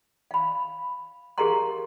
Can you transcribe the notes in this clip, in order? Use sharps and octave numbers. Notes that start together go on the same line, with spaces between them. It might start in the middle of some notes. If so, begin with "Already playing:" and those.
F5 B5
G4 G#4 A#4 F5 A#5 C6